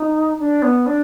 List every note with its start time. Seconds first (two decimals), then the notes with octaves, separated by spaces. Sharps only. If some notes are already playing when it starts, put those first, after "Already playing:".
Already playing: D#4
0.39 D4
0.62 B3
0.86 D4